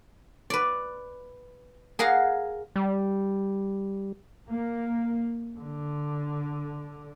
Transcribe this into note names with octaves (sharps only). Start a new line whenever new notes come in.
B4 D5
G#4 A#4 F5 F#5
G3
A#3
D3